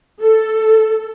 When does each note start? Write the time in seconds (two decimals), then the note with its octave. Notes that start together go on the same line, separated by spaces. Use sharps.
0.21 A4